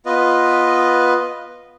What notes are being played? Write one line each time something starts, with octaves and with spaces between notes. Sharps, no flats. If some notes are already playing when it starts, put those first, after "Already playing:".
B3 F4 B4 D#5